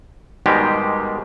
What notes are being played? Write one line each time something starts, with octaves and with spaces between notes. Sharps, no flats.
G#2 B2 D#3 G3 G#3 G4